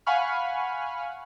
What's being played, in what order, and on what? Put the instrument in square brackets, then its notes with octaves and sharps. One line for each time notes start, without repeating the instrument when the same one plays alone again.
[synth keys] F5 F#5 G#5 B5 C#6 F6